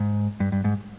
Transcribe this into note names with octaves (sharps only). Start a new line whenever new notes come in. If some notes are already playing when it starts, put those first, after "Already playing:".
Already playing: G#2
G2
G2
G#2